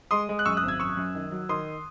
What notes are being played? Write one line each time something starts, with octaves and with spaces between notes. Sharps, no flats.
G#3 C6 D#6
G#3
F#6
F#2 C#6 E6
D#6 F#6
G#1
E6 G#6
F#2 C#6 E6
F#2
D#3
F#3
D#3 C6 D#6